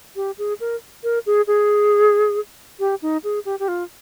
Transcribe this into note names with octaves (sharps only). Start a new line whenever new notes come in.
G4
G#4
A#4
A#4
G#4
G#4
G4
D#4
G#4
G4
G4
F4